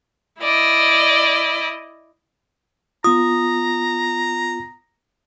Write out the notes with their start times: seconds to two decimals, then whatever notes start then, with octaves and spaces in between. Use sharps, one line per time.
0.41 E4 D5 D#5
3.04 B3 F4 A#5 D#6